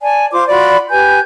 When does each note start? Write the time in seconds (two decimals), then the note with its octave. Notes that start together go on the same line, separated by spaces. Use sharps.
0.01 D5 G#5 A5
0.32 F4 C5 C6 D6
0.49 F4 F#4 D5 B5
0.90 G4 B4 G#5 G6